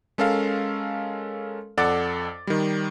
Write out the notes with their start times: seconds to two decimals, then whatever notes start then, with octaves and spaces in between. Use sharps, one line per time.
0.18 G#3 C#4 A4 A#4 F5
1.77 F2 A4 D5 F#5 D6 A6
2.47 D#3 G3